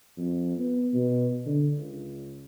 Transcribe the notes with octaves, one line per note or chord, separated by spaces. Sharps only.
F2
B3
B2
D3
C#2